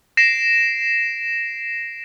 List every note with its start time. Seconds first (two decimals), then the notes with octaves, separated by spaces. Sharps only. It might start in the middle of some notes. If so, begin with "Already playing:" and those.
0.17 A#6 C7 D7 E7